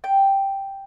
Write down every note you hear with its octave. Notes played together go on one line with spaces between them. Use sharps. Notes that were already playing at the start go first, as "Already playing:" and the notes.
G5